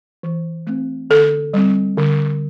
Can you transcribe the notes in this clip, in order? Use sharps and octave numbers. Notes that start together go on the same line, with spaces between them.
E3
A3 C4
D3 A4
G3 C4
D3